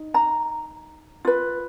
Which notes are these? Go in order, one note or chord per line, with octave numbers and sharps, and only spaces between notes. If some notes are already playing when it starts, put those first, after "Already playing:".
Already playing: D#4
A#5
F4 B4